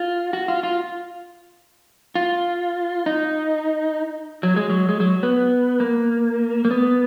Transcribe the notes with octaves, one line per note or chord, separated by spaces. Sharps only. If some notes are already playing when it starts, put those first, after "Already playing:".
Already playing: F4
F#4
F4
F4
F4
D#4
F#3
G#3
F#3
G#3
F#3
B3
A#3
A#3
B3